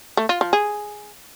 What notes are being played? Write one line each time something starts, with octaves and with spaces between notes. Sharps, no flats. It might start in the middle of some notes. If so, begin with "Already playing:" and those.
A3
F4
F3
G#4